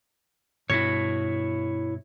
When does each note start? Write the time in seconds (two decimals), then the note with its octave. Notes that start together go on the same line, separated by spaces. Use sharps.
0.70 G2 B2 E4 C#5